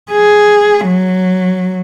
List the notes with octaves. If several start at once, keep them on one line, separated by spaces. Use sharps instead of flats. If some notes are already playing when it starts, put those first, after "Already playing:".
G#4
F#3